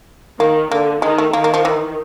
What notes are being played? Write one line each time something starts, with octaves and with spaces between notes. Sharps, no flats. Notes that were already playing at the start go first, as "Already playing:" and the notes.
D#3 A#3
D3 A#3
D#3 G#3
A3
D#3 A#3
A#3
F3
E3